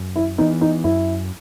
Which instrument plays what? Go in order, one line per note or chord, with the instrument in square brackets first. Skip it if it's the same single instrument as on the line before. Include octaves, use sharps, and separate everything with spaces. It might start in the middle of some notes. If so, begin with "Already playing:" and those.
Already playing: [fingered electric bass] F#2
[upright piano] E4
[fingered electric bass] E3 B3 [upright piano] D#4
[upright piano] D#4
[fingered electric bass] F#2 [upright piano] E4